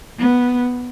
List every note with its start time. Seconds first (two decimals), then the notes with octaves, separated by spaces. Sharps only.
0.19 B3